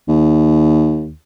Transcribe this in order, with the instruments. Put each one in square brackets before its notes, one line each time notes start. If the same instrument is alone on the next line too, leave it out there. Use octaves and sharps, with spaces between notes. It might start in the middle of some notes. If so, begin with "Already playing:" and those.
[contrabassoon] D#2